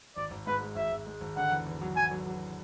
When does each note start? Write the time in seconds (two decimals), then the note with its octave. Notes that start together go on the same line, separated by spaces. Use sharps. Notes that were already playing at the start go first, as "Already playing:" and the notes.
0.17 G#1 D5
0.31 G#1
0.47 G#2 B4
0.61 G#3
0.76 G#1 E5
0.92 G#1
1.07 G#3
1.21 G#1
1.36 D3 F#5
1.52 E2
1.66 E2
1.82 F#3
1.96 F#3 G#5
2.11 F#3
2.27 F#3